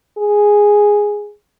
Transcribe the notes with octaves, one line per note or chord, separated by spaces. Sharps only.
G#4